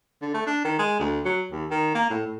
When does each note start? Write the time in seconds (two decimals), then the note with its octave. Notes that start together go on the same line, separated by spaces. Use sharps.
0.22 D3
0.34 A3
0.47 D4
0.64 D#3
0.79 G#3
0.99 D2
1.25 F#3
1.52 D#2
1.71 D#3
1.95 A#3
2.10 A2
2.26 A2